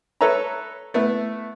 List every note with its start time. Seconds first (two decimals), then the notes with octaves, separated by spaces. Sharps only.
0.21 A4 B4 C#5 E5 A#5
0.94 A3 B3 E4